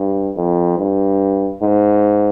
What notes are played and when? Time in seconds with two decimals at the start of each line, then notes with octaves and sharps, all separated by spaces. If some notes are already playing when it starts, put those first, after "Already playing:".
Already playing: G2
0.36 F2
0.78 G2
1.61 G#2